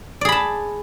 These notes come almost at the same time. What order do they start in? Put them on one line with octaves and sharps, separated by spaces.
D5 G#4 B5 A5